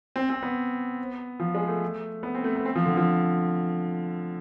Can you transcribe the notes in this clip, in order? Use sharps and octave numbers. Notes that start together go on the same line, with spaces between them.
C4
C4
B3
F3
G#3
A3
B3
C4
A3
B3
C4
F3
D3
F3